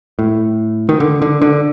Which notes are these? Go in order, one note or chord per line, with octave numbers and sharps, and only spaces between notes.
A2
D#3
D3
D3
D3